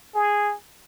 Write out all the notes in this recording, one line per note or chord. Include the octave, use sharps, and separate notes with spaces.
G#4